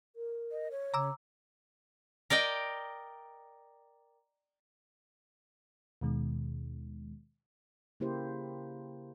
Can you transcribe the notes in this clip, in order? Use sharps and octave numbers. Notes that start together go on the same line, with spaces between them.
A#4
D#5
C#5
C#3 A#5 D6 E6
A#4 D5 D#5 G5
D#2 B2 D#3 G#3
C#3 A#3 E4 G4 C5